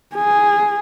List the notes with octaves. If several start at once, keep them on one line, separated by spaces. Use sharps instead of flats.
G#4